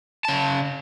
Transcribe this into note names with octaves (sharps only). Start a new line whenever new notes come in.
C#3 A5